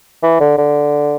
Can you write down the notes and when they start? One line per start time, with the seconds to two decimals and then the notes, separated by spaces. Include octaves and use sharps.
0.23 E3
0.40 D3
0.58 D3